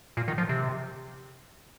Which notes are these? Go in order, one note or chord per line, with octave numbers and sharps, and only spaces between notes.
A#2
D#3
F3
C3